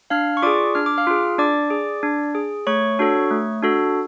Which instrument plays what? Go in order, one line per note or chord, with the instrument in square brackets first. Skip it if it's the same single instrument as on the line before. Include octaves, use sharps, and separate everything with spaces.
[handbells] D4 F5 F6
C#6
F4 G#4 D5 D6
D4 F6
D6
F5 F6
F4 G#4
D4 D5 D6
G#4
D4
G#4
A3 C#5 C#6
D4 F#4 A4
A3
D4 F#4 A4